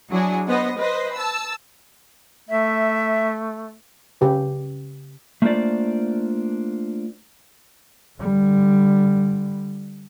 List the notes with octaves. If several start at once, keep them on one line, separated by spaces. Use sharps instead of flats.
F#3 D4 E4 G#4
B3 C5 D#5
B4 C5 D#5
A5 E6
A3 E5
C#3 G4 B4
A3 A#3 D4 F4 C5 D5
D3 G3